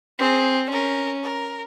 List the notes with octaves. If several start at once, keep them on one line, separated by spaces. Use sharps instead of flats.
C4 G#4
C#4 A#4
A#4